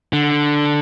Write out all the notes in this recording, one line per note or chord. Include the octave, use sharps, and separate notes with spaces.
D3